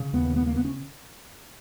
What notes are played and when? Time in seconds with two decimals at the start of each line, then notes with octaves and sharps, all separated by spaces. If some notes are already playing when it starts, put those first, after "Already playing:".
Already playing: C#3
0.13 D#2 B3
0.36 C#3 B3
0.46 A#3
0.56 B3
0.65 C#4